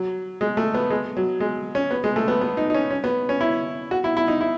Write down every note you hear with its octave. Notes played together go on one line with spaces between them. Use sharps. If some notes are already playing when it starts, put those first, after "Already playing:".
Already playing: F#3
G#3
A3
B3
G#3
F#3
G#3
C#4
B3
G#3
A3
B3
B3
D#4
D#4
C#4
C#4
B3
C#4
E4
F#4
E4
E4
D#4
E4